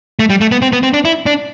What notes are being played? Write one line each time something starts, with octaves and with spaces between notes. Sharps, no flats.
A3
G3
A3
B3
C4
B3
C4
D4
E4
D4